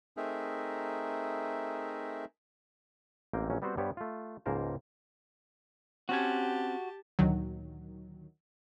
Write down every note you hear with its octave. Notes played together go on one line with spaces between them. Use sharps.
A3 C4 D#4 G#4 A#4 E5
A1 A#3 C4 G5
A#1 E3 F#3 C#4
G3 B3 C4 F#4 C5
G2 G3 B3 G4 C5 C#5
A3 F4
C#2 G#2 A#3 A#4 C5 A5
C4 C#4 F#4 G4 G#5 A5
D2 A#2 D#3 F#3